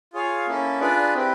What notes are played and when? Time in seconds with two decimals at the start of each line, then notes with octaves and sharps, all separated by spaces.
0.13 F4 G#4 C#5 F5
0.47 A#3 C#4 E4 A4
0.80 D4 F4 G#4 B4 D5
1.14 C4 E4 G4 B4